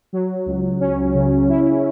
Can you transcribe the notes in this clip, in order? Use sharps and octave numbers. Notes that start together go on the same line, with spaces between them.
F#3
C#2
C#4
C#3
E4